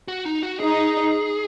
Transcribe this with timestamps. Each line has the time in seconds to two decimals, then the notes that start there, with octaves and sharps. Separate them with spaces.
0.08 F#4
0.25 D#4
0.43 F#4
0.60 D#4 G#4